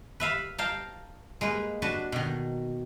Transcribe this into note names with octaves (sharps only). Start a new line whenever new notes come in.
B4 E5 F5 B5
F5 G5 A5 A#5
G#3 A#3 B4
D4 F#4 B4 A5
B2 D#3